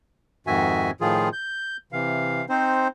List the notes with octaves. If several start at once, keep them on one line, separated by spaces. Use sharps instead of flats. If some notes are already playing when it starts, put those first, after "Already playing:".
F2 G#2 D#3 F#4 E5 G#5
A2 D#3 F3 F4 G#4
G6
C3 E3 F5
C4 D#4 C5